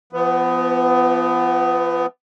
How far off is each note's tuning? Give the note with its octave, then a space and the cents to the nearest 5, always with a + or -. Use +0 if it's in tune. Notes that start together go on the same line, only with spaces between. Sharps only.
F3 -30 B3 +20